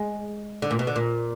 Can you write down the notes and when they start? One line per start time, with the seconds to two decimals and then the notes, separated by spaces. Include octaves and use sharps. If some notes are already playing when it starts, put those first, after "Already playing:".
Already playing: G#3
0.62 D3
0.71 A#2
0.79 B2
0.87 D3
0.96 A#2